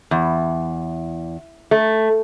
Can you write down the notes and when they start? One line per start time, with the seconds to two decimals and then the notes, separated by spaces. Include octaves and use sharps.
0.11 E2
1.71 A3